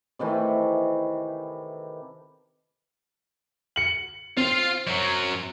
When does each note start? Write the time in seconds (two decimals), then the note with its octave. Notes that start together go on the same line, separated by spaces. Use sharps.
0.19 C3 D#3 E3 A3
3.76 C#7 F#7
4.37 C4 F4 F5
4.87 F#2 F#3